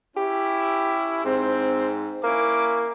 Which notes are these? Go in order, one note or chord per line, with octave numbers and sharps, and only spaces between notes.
C#4 E4 G4
G#2 C4
A#3 C#4 E4 D6